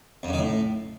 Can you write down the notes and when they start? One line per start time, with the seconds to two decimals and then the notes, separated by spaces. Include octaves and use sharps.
0.23 F2
0.28 F#2
0.33 D#3
0.39 A2